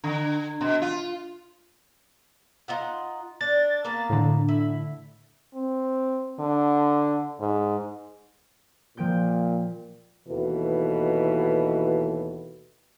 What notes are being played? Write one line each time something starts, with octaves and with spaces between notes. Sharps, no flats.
D3
B2
F4
D#4 F4 F#5
D4 A6
A#3 B3 F5
A2 D3
E4
C4
D3
G#2
A#2 F3 G5 G6
D#2 B2 E3 A4